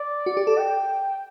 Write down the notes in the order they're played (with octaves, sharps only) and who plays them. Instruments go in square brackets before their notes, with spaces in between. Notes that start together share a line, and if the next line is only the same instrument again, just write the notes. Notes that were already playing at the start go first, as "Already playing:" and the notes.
Already playing: [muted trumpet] D5
[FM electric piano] F#4
G4
A4
[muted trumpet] G5